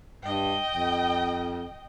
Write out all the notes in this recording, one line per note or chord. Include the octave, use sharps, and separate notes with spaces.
G2 D#5 G5
F2